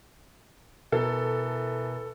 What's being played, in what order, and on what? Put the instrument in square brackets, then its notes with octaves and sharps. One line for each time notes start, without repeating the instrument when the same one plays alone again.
[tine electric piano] B2 A#4 [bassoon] E3 [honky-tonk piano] A4